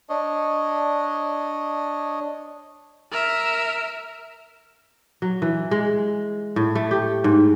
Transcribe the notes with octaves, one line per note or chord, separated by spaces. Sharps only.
D4 C#5 D#5
A#4 E5
F#3
E3
G#3
A2
A3
G4
G#2